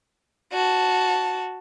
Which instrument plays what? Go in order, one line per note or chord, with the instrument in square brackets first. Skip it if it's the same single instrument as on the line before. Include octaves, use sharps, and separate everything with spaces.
[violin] F#4 A5